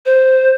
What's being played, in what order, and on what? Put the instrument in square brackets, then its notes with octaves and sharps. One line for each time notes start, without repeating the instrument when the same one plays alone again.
[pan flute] C5